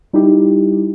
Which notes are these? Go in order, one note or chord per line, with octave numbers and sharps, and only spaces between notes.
G3 D#4 E4 G4